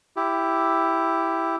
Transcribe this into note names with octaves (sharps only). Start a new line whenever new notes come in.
E4 G4